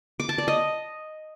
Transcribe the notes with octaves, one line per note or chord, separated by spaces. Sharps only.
D6
A5
D5
D#5